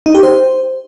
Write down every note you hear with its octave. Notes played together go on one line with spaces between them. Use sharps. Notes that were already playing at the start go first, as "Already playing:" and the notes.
D#4
G4
C5